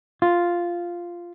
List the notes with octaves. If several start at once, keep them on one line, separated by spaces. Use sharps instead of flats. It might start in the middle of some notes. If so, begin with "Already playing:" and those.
F4